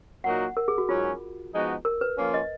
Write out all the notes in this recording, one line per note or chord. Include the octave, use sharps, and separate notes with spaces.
A#2 F#3 A#3 D#4 F#4 F#5
A#4
G#4
F#4
G#2 F#3 C#4 F4
F3 G#3 B3 D#4 F#4
A#4
B4
F3 A#3 C#4 F4
D#5